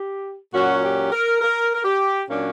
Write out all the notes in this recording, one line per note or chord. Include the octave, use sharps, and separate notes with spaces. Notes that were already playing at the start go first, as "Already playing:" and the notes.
Already playing: G4
A#2 F#3 C#4 F#4
G4
A#4
A#4
A#4
G4
A#2 F#3 A#3 C#4 D4